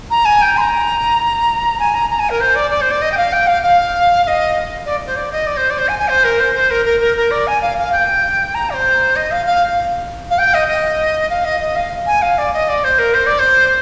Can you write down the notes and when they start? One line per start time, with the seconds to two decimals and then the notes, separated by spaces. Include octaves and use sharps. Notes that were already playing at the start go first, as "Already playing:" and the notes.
0.10 A#5
0.25 G#5
0.41 G5
0.57 C6
0.60 A#5
1.79 G#5
1.94 A#5
2.10 A#5
2.19 G#5
2.29 A#4
2.40 C5
2.55 D5
2.70 D5
2.81 C5
2.91 D5
3.01 D#5
3.11 G5
3.17 F5
3.32 G5
3.47 F5
3.62 F5
4.23 F5
4.27 D#5
4.85 D5
5.06 C5
5.16 D5
5.32 D#5
5.46 D5
5.56 C5
5.70 D5
5.78 C5
5.88 G#5
5.98 G#5
6.08 C5
6.24 A#4
6.39 C5
6.55 C5
6.70 A#4
6.85 A#4
7.00 A#4
7.16 A#4
7.30 D5
7.47 G#5
7.61 F5
7.77 F5
7.92 G5
8.54 A#5
8.69 D5
8.73 C5
9.15 D#5
9.31 F5
9.46 F5
10.30 F5
10.38 G5
10.54 D#5
10.68 D#5
11.29 F5
11.44 D#5
11.60 D#5
11.75 F5
12.06 G#5
12.22 F5
12.38 D5
12.53 D#5
12.68 D5
12.84 C5
12.98 A#4
13.14 C5
13.26 D5
13.39 C5